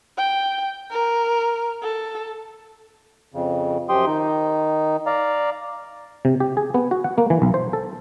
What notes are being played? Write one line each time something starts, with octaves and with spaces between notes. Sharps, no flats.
G5
A#4
A4
F2 C#3
F#2 F3 G4 G5 C6 D#6
D#3 D#4
D5 F5 A#5
C3
G4
G#4
B3
F#4
F#5
A#3
E3
B1
C5
A4